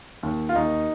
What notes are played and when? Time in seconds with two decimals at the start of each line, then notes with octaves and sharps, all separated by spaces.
0.23 D#2
0.49 F4
0.55 D#2 D#4